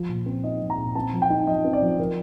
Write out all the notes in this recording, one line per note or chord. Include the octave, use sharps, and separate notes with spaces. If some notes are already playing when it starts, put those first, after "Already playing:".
Already playing: F3
A#2
C4
D#4 D#5
F3
A#5
A#2
C4 A5
F3
G5
D#4
F3 D#5
C4
D5
F3
F3 A#4